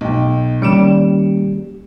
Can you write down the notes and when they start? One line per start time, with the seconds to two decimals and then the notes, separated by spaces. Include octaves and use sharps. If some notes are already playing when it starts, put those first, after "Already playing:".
0.01 B1 G5
0.62 D#3 G3 A#3 C#4 C#7 D7 E7